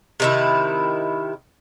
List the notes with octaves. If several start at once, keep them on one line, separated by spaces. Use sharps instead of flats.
C3 D#3 E4